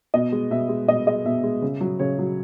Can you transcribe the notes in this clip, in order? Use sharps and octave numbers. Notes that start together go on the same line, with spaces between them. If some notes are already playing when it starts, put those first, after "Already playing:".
B2 D#5
G#3
B2 E5
G#3
B2 D#5
G#3 D#5
B2 E5
G#3
C#3
F#3
C#3 C#5
F#3